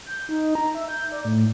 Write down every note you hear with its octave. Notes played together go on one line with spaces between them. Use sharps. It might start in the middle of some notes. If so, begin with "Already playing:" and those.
G6
D#4
A#5
E5
G6
D5
A2